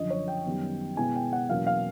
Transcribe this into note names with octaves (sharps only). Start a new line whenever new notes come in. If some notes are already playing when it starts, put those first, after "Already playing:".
Already playing: F#2 D3 F3 D#5
C#5
G5
F#2 D#3 G3 B3
B2 G#3 B3 E4 G#5
G5
F#5
E2 B2 F#3 A#3 C#4 F5
F5